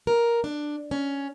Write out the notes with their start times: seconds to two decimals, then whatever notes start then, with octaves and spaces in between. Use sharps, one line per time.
0.07 A#4
0.44 D4
0.91 C#4